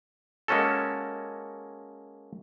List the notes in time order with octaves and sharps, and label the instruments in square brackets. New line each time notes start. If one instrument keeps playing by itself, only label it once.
[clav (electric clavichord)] G#3 A#3 C#4 F#4 A4